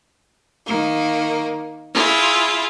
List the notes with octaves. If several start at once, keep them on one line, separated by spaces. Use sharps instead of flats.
D#3 A#3
E4 F4 G#4